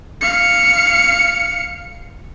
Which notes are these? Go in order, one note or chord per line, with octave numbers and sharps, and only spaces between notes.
F5 C#7